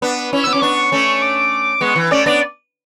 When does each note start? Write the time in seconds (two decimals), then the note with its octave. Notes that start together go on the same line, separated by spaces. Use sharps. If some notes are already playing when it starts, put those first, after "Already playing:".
0.02 B3 D4
0.33 C#4 E4
0.44 B3 E6
0.53 C#4 D6
0.62 B3 D4 C#6
0.92 A3 C#4
1.22 D6
1.81 G#3 B3 C#6
1.96 E3
2.11 A3 C#4 D5
2.26 B3 D4 D5